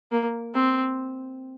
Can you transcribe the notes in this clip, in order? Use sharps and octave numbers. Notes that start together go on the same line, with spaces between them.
A#3
C4